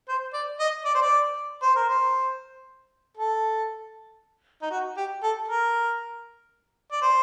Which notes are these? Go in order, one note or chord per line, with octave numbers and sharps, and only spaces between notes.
C5
D5
D#5
D5
C5
D5
C5
A#4
C5
A4
D#4
F#4
G4
A4
A#4
D5
C5